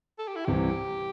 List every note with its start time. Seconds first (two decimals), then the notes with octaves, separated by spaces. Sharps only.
0.19 A4
0.27 G4
0.36 E4
0.45 C2 C3 E3 G4